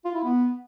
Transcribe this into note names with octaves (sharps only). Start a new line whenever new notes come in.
F4
E4
B3